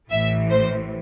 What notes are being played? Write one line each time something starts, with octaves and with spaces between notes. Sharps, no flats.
A1 A2 E3 E5
C5